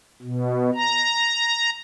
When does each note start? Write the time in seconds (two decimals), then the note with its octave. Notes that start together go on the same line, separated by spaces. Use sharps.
0.22 B2
0.75 A#5